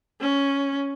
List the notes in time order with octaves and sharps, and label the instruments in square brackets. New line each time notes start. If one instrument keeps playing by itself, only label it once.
[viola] C#4